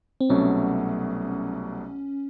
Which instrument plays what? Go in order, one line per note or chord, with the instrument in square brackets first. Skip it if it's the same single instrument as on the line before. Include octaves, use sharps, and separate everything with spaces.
[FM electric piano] C4
[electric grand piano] C2 B2 F#3 A3 [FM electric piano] C#4